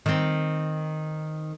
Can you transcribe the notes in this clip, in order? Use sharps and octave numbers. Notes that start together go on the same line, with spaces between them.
D#3 C4